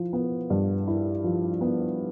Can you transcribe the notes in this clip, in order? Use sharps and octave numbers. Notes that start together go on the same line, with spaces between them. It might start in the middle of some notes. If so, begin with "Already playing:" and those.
Already playing: F3 E4
B3
G2
E4
F3
B3